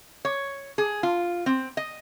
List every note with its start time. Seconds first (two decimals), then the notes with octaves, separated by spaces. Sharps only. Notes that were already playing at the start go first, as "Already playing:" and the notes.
0.25 C#5
0.78 G#4
1.03 F4
1.46 C4
1.77 D#5